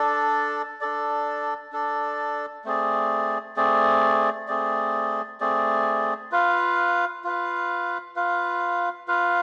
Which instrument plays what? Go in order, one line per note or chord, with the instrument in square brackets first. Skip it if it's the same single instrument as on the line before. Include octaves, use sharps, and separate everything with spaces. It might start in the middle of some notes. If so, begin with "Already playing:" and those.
Already playing: [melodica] D4 A4 D5
D4 A4 D5
D4 A4 D5
A3 C4 G#4 D5
A3 C4 G#4 D5
A3 C4 G#4 D5
A3 C4 G#4 D5
F4 B4 F5
F4 B4 F5
F4 B4 F5
F4 B4 F5